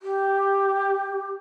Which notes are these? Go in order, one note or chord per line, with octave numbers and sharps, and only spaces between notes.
G4